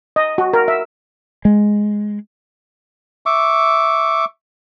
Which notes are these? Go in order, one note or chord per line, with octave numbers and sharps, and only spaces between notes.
D#5
F#4
A#4
E5
G#3
E5 C#6 D6